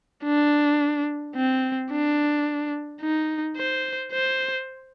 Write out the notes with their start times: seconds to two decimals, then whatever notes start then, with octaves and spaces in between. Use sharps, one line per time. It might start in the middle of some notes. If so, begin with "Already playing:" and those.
0.24 D4
1.36 C4
1.92 D4
3.02 D#4
3.57 C5
4.13 C5